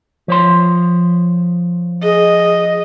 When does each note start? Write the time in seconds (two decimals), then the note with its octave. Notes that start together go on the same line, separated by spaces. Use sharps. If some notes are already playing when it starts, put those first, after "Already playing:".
0.28 F3 C#5 C6
2.03 G#4 D#5